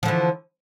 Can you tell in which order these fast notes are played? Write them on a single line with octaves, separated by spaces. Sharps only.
F3 D3 E3